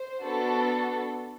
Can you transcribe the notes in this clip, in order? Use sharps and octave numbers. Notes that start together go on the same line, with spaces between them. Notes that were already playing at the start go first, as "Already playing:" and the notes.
Already playing: C5
B3 D4 F#4 A4